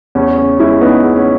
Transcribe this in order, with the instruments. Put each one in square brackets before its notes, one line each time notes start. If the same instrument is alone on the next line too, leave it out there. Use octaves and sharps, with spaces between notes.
[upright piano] E2 C#4
C#3 C#4
G#3 C#4 E4
C#3 B3 D#4
C#3
C#4